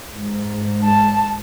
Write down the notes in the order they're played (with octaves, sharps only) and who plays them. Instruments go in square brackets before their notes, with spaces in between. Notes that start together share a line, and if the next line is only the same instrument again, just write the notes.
[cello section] G#2
[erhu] A5